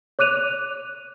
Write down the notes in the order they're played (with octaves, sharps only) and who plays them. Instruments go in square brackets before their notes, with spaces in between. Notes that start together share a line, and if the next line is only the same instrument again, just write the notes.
[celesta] C#5 D6 F#6 D#7 F7